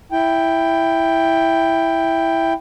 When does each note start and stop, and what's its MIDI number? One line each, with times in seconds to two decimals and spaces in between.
0.12 2.53 64
0.12 2.53 79